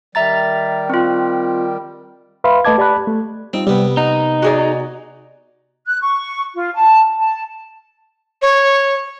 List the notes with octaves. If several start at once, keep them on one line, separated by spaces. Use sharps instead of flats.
D#3 G3 E5 A#5 A6
C4 F4
B4 E5 F5 B5 C6
A3 B4 D#5 A5 D6 G#6
G4 D5 A5 B5 F#6
A3
G3 C4 D#4 F4
C3 G3 B3 B4
D#4 F#5
F#4 G#4 D5
F#6
C#6
F4
A5
A5
C#5